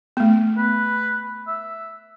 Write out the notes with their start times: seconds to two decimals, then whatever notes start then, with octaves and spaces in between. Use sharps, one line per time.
0.17 A3 B3
0.58 B4
1.47 E5